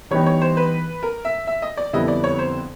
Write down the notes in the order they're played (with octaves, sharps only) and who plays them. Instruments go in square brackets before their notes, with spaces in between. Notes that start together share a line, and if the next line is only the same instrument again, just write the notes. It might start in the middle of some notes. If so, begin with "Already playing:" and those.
[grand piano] E3 G3 B3 D#4 G4 [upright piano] C#5
[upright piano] C#5
C5
B4
A#4
E5
E5
D#5
D5
[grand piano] F2 D3 G3 B3 E4 [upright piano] D#5
[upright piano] D5
C#5
C5